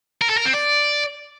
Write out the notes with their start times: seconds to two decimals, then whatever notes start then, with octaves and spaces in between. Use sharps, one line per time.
0.22 A#4
0.30 A4
0.38 A#4
0.46 C4
0.54 D5